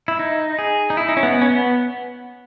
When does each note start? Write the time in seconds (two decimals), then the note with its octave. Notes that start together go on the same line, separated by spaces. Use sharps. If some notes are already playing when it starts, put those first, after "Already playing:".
0.08 E4
0.19 D#4
0.59 G#4
0.90 D#4
0.97 E4
1.09 D#4
1.17 C#4
1.23 B3
1.41 C#4
1.50 B3